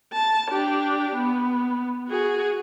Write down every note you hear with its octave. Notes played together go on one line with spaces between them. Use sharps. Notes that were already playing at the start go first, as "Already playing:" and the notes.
A5
D4 G4
B3
F#4 G#4